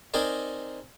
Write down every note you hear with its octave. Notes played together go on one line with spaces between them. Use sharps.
C4 D#4 G#4 A#4 D5